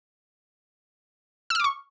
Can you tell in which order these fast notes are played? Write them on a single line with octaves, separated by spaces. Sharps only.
E6 F6 D6 C#6